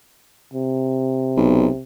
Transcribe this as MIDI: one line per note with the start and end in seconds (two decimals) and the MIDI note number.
0.53 1.83 48
1.37 1.67 35